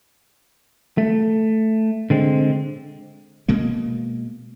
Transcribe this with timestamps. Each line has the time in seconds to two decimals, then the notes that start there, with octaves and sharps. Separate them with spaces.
0.98 A3
2.10 D3 G#3 C4
3.48 B2 G#3 A#3